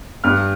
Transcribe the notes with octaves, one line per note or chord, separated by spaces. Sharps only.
G2 F6